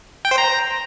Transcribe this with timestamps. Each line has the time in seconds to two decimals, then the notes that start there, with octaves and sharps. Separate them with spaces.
0.25 G5
0.31 C5
0.38 A#5